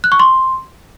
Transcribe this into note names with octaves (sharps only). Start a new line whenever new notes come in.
F#6
C#6
C6